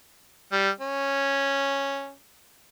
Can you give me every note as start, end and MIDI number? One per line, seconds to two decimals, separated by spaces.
0.52 0.70 55
0.80 2.12 61